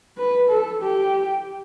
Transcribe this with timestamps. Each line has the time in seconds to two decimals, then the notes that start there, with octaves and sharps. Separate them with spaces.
0.18 B4
0.49 A4
0.82 G4